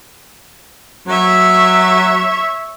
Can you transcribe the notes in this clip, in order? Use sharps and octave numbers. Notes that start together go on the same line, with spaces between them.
F#3 C#5 E5